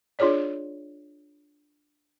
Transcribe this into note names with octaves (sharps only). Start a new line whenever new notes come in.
D4 F4 G#4 C#5 D5